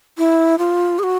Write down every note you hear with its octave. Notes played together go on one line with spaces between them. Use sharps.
E4
F4
G#4
F#4